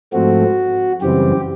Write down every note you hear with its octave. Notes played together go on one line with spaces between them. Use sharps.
G#2 F3 A3 C4 F#4
F#2 C#3 E3 G3 C4 G4